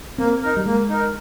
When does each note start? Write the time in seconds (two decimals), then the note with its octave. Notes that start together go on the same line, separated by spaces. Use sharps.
0.18 A#3 C4
0.43 D#4 A#4
0.57 G3
0.66 G#3 A#3
0.89 D#4 A#4